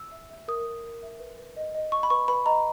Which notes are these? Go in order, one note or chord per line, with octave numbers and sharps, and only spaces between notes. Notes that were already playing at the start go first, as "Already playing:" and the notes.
Already playing: E6
E5
E5
A#4 D#6
A#4
A#4
E5
B4
B4
D#5
D#5
D#5 C#6
B5
B4 C#6
B4 B5
D#5 A#5